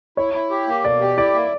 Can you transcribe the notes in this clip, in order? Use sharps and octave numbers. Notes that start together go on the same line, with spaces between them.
E4 C#5
E4
G4
A#3
B2 D5
G4
E4 D5
A#3